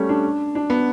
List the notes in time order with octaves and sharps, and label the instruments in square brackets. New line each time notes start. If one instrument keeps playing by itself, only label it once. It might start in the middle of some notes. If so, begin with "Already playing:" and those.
Already playing: [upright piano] G3 A3 C#4
D4
D4
B3